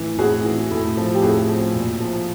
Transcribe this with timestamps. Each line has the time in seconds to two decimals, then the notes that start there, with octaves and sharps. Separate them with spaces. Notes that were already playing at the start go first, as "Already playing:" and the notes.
Already playing: A2 E3
0.18 A2 F#4 G#4
0.44 E3
0.71 A2
0.97 F3
1.14 G4
1.22 A2 F#4 G#4
1.49 F3
1.75 A#2
2.00 F3